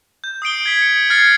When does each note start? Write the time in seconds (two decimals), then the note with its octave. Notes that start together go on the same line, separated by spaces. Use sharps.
0.24 G6
0.42 D#6 C7 D7 G7
0.66 G#6 B6
0.82 C#7 D7
1.10 F6 G#6 A6 C7 C#7